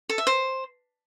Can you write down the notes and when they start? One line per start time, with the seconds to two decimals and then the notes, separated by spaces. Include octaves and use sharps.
0.09 A4
0.18 E5
0.27 C5